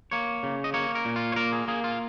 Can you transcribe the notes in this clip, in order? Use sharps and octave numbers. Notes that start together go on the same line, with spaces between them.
A#3 C#5
C#3
D#5
A#3 C#5
A#4
A#2
F4
C#5
A#3 A#4
G#4
A#3 G#4
F4